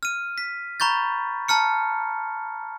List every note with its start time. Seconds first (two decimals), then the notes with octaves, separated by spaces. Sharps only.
0.03 F6 D#7
0.38 B6
0.80 A#5 B5 C#6 G6 A6
1.48 A5 A#5 F6 C#7